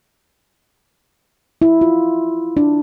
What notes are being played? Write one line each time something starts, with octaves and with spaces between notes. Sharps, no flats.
E4
F4
D4